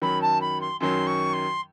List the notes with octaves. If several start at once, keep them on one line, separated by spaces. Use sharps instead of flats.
F#2 D#3 F#3 B5
A5
B5
C6
F#2 D#3 F#3 C6
C#6
C6